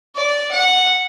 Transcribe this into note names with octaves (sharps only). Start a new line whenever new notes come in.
D5
F#5